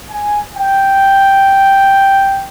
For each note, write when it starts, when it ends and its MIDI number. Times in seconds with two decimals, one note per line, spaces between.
0.11 0.38 80
0.53 2.48 79